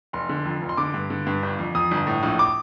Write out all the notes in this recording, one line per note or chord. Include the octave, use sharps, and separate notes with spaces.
F1 C6
D3
F2
F1
C6
D3 D6
G2
D3
G2
G1
F2
F2 D#6
G1
A2
A#1
D6